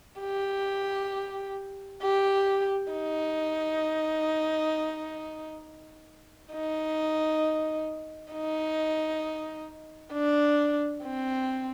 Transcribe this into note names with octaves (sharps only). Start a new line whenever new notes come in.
G4
G4
D#4
D#4
D#4
D4
C4